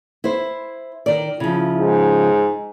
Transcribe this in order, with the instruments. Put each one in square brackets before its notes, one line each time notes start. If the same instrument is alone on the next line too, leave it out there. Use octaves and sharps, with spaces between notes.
[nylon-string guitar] E4 C5
D#3 D5
[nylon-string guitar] C#3 F3 [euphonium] E4
[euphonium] G#2